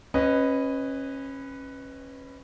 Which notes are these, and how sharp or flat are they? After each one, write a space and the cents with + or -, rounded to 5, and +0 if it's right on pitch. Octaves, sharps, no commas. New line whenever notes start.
C#4 -25 B4 +5 D#5 +0